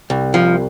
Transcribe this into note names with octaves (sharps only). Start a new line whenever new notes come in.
C2
F3